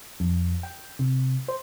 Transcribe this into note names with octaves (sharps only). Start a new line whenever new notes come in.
F2
G5
C3
C5